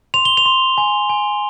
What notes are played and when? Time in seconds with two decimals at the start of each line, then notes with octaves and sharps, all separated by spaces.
0.14 C6 F7
0.25 G7
0.37 F7
0.46 C6
0.78 G#5
1.09 G#5